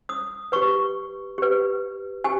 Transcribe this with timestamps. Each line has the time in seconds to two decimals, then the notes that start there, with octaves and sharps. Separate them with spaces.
0.09 D#6
0.52 G4 B4 C#6
1.38 G4 B4
2.24 G4 G#5